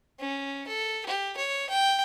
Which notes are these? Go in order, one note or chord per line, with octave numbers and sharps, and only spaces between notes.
C#4
A4
G4
C#5
G5